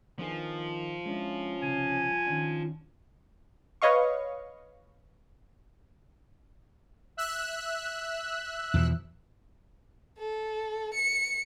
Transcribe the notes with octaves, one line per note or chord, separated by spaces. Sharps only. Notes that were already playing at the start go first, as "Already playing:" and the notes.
D#3 F3 B3 D4 G#4
G#3 C#4 D4 E4
C2 C#3 G#5
D#3 C#4 D4
B4 C#5 D#5 F5 C#6
E5 E6 F#6
E2 B2 F3
A4
C#7